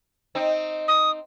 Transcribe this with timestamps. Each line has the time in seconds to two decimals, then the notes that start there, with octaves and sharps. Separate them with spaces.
0.35 C4 D#4
0.88 D#6